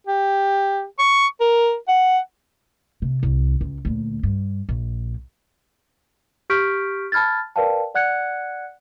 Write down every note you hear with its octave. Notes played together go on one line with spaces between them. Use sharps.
G4
C#6
A#4
F#5
C3
C2
C#2
D2 A#2
G2
A#1
G4 C#6 F6 G6 B6 D7
A5 B5 F6 G#6 A6
A#4 B4 D5 F5 G5 A5
D5 F#5 F#6 G#6 C#7